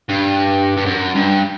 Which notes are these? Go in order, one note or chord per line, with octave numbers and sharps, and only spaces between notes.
G2
G2
F#2
G2